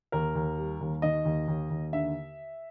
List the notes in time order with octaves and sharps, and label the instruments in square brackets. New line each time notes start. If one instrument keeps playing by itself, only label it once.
[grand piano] D#2 A#4
D#2
G3
D#2
D#3 D#5
D#2
D#2
D#2
D3 E5